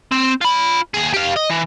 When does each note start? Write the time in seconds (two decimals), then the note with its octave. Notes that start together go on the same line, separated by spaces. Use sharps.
0.12 C4
0.41 F4 B5
0.94 D#2 G#4
1.14 G4 F5
1.36 D#5
1.50 E3